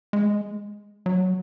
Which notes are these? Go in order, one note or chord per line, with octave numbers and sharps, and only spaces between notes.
G#3
F#3